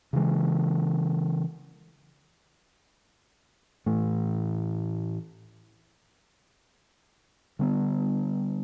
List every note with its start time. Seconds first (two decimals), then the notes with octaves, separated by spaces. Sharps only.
0.13 C#3 E3 G#3
3.86 A2 E3 A3
7.59 D3 G3 B3